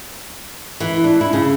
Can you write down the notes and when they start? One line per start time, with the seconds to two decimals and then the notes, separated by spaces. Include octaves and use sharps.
0.80 E3
1.04 D4
1.21 E4
1.33 C#3